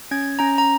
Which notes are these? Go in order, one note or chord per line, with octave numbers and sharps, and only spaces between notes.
C#4 G#6
C#4 A#5
A#5